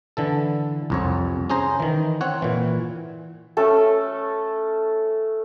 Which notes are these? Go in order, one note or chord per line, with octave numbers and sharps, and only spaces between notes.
D3 E3 A4
C2 F2 C#5
C#4 G#4 C5 A#5
D#3 E3
C4 C#5 F#5
A#2 E3
A3 C#4 A4